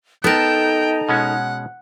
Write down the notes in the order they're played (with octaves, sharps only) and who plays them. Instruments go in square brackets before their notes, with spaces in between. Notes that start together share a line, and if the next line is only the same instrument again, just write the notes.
[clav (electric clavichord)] B3 A#4 [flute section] D#4 A#5 [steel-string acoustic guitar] A4 A5 [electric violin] G5
[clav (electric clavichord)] B2 G#3 C#4 [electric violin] F#5